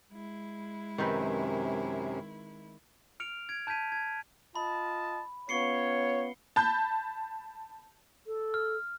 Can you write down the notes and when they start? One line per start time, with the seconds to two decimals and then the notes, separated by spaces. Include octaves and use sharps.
0.12 G#3 E4
0.98 F#2 C3 D#3 C4 B4
3.20 F6 C#7 D7 F7
3.49 G#6 D7
3.67 A5 G6 G#6 B6 D#7
3.92 G#6
4.55 F4 D#5 A5 B5
5.49 B3 C#4 F4 C#5 C7 C#7 G7
6.56 A5 B5 G6
8.27 A4
8.54 F6